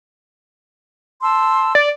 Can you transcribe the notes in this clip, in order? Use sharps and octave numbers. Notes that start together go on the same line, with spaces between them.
A5 C6 E6
D5